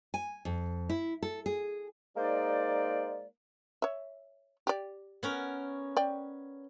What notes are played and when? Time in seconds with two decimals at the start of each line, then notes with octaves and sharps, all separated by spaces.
0.14 G#5
0.45 F2
0.89 E4
1.22 A4
1.46 G#4
2.16 G#3 A#3 D#4 C5 D5
3.82 C#5 E5
4.67 G4 D5
5.23 B3 C#4 A#4
5.97 D5 G5